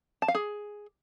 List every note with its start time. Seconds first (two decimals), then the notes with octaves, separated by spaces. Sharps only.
0.22 A5
0.28 F5
0.35 G#4